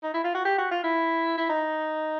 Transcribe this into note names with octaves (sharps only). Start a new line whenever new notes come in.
D#4
E4
F4
F#4
G4
F#4
F4
E4
E4
D#4